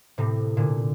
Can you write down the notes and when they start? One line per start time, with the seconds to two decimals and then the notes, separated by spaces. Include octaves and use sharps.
0.18 A2 C3
0.57 A#2 D3